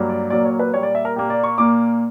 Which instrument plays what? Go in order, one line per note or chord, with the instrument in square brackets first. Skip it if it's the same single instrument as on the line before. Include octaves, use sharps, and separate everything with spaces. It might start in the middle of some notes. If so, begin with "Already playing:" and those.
Already playing: [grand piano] G2 F#3 A#3
D5
A#2 F#3 A#3 D5
C#5
B4
A#2 G3 A#3 C#5
D5
E5
A#4
A#2 A#3 G4
D5
C#6
A#2 A#3 D6